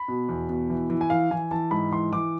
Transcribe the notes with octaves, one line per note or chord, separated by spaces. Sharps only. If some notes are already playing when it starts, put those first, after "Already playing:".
Already playing: B5
B2
E2
B2
E3
E3
G#5
E3 F5
E3 G#5
E3 A5
G#2 B5
E3 C6
E3 D6